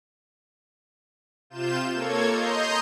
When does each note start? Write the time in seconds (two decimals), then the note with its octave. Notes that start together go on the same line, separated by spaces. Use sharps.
1.50 C3 F4 G6 E7
1.94 A#3 A4 C#5 G#6
2.29 D#5 A#5 C6 G6